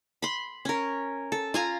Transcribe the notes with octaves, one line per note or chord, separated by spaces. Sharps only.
B5 C6
C#4 A#4
A4
F4 G#5 A#5